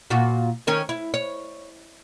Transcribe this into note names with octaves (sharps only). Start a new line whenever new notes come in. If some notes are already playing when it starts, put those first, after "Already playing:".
A#2 F4 F#4
D#3 C#4 A#4
E4
C#5